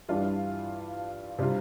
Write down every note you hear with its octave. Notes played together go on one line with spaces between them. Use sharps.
G2 E3 G3 D4 F4
C3 G3 D4 F4